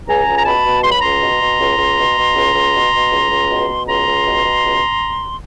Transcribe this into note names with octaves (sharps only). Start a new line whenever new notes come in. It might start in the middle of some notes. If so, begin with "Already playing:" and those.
C#2 G#5 A#5
C#2
A#5
B2 A5 B5
B2
C#2 C6
B5
C#2 A#5 C6
B2
B2
C#2
C#2
B2
B2
C#2
C#2
B2
B2
C#2
C#2
B2
B2
C#2 A#5 C6
C#2
B2
B2
C#2